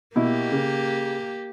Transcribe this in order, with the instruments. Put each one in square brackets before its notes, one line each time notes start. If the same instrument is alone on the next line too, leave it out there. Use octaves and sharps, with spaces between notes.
[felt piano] B2 E4 [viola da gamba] A#3 G4
[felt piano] C#3